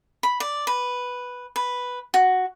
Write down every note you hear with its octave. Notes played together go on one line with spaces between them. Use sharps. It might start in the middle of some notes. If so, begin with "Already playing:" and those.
B5
D5
B4
B4
F#4